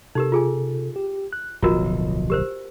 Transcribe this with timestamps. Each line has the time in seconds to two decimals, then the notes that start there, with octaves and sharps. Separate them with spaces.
0.15 C3 D#4 G4 A4 A#4
0.32 F4 G#4 G#5
0.96 G4
1.33 F#6
1.62 D1 B1 F3 F4 F#4 A#4 D#5
2.30 G4 A#4 C5